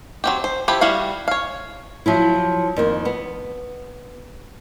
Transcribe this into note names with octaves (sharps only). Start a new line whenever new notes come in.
F#3 C4 G4
C5
F3 E4 G4 B5
G3 E4 F#4 F5
C#5 F5
F3 F#3 E4
F2 D#3 A#3
B3